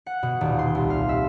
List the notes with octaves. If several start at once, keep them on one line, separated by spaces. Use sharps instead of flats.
F#5
B2
D#1
C6
C2
F5
E5